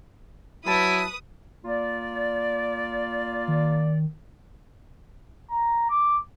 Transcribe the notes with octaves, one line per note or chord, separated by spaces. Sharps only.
F#3 E4 B4 A5 B5 D#6
A#3 F4 D5
D#3
A#5
D6